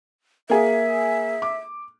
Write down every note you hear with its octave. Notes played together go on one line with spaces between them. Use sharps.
A#3 G#4 E5
D6